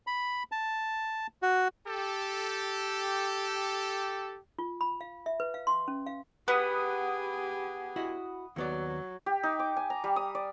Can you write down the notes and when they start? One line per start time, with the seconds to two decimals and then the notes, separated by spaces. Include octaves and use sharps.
0.07 B5
0.52 A5
1.42 F#4
1.87 G4 A4
4.59 F4
4.81 B5
5.01 F5
5.26 E5
5.40 B4
5.54 F5
5.67 C6
5.88 C#4
6.07 F5
6.48 B3 G4 G#4 B4 F#5 B5 D#6
7.96 E4 F#4 D#5
8.56 D#2 F#3 B3 D5
9.26 G4
9.43 D#4
9.59 D6
9.77 G#5
9.90 A#5
10.04 G3
10.16 D#6
10.35 D5